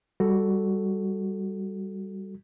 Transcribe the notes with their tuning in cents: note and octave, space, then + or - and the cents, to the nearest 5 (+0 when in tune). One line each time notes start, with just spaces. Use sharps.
G3 +0 F#4 +5 A4 +0